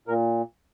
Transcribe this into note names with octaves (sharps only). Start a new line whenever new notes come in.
A#2 A#4